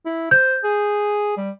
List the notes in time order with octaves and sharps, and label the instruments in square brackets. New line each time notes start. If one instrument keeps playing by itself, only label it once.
[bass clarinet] E4
[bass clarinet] C5 [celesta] G6
[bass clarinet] G#4
G3